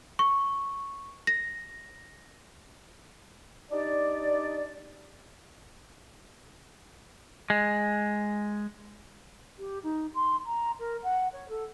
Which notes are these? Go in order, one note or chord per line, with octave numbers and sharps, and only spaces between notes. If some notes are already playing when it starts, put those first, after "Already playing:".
C#6
A#6
D4 D#4 G4 D5
G#3
G4
D#4
C6
A#5
A#4
F#5
C#5
A4